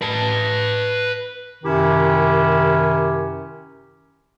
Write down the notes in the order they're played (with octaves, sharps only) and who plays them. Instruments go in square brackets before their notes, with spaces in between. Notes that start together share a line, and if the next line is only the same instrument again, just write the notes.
[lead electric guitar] B4 A5
[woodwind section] F#2 C3 D#3 C#4 E4 G4